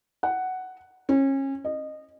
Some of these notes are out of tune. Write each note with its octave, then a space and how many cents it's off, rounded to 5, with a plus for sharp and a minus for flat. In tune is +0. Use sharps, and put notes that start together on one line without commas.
F#5 +5
C#4 -30
D#5 -20